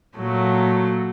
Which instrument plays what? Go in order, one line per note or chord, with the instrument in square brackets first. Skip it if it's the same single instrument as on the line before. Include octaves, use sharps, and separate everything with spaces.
[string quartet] A#2 F#3 A3